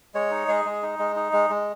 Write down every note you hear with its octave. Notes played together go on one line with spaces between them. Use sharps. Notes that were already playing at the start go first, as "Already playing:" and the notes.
G#3 C#5
D#4
G#3 G#4
G#3
D#4
G#3
D#4
G#3
G#3